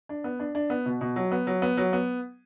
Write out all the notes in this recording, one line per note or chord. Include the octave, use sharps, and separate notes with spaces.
D4
B3
D4
D4
B3
B2
B2
F#3
B3
F#3
B3
F#3
B3